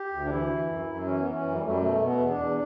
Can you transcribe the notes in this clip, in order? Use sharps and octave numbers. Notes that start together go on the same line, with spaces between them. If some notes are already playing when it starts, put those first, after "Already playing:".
Already playing: G4
D2
D4
E3 E4
E3
F#2
F#2
E3 C#4
E3 B3
C#4
F#2
G3
F#2 A3
G3
B2 A3
B2
B3
E2
D4
E2